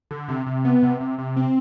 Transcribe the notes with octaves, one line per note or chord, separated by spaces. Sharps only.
D3
C3
C3
B3
C3
C3
C3
C4